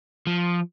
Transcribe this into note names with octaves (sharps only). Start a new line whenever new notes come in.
F3